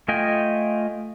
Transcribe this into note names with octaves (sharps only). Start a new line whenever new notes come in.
A3 F4 D#5 G5 G#5